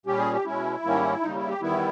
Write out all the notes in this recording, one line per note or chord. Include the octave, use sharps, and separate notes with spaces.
A#2 G3 C#4 G4
G#4
G4
B2 G#3 C#4 E4
G#2 D#3 G3 A#3 C#4
D#2 C#3 G3 D#4
E4
G4
E2 D#3 G3 B3 E4